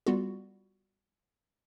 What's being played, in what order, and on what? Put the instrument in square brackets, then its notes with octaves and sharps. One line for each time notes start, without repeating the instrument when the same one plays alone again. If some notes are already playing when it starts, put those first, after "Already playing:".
[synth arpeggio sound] G3 B3 F4 F#4